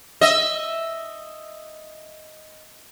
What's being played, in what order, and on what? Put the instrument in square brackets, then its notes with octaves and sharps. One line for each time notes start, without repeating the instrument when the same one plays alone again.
[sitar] D#5 E5